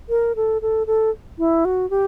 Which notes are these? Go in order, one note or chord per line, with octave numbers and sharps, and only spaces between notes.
A#4
A4
A4
A4
E4
F#4
G4